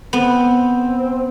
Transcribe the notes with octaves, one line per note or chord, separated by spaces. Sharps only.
B3 C4